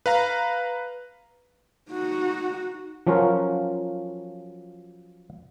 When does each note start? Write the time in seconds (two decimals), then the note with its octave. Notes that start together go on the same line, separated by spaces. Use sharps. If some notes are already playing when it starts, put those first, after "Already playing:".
0.06 B4 F5 A#5
1.91 D#4 F#4
3.07 F3 F#3 C#4 F4 F#4 A#4